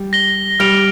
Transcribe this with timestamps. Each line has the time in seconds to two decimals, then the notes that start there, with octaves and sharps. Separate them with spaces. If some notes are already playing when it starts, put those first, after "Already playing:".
Already playing: G3
0.13 A#6 G7
0.60 G3 F6 D7 F7